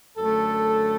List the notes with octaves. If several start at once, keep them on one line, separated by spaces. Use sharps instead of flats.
F#2 D3 A3 A4